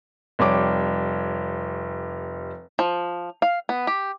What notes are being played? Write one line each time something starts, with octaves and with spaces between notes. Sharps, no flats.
F1 G3 C#5 D6
F3
F5
B3
G4